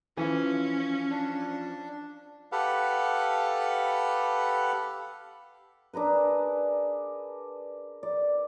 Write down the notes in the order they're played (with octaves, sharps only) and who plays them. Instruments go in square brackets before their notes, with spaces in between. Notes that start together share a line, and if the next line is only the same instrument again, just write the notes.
[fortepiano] E3 [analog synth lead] F3 [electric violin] C#4
[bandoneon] D4
[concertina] G4 A4 B4 F5 F#5
[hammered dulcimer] D4 G#4 A#4 B4
D5